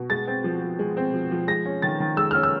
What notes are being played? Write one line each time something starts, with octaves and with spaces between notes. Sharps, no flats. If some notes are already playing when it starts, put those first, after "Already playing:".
Already playing: B2
G#3 A6
C4
F3
F3
G#3
C4
F3
F3
G#3 A#6
C#4
D#3 A6
D#3
G#3 E6
C#4 F6
E6